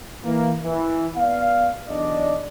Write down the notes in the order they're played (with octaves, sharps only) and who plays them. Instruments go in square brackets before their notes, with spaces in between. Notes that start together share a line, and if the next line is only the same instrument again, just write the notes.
[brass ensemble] E3 A#3
E3
B3 D5 F5
B1 E2 D4 D5 D#5